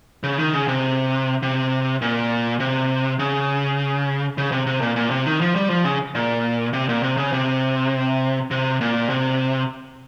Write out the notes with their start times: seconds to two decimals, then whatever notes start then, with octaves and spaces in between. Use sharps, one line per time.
0.23 C#3
0.38 D#3
0.53 C#3
0.68 C3
1.42 C3
2.02 A#2
2.60 C3
3.19 C#3
4.38 C#3
4.52 C3
4.66 C3
4.82 A#2
4.96 A#2
5.10 C3
5.26 D#3
5.41 F3
5.56 G3
5.70 F3
5.84 C#3
6.15 A#2
6.73 C3
6.89 A#2
7.03 C3
7.17 C#3
7.33 C3
8.51 C3
8.81 A#2
9.09 C3